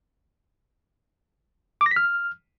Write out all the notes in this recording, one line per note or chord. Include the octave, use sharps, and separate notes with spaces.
D6
A#6
B6
F6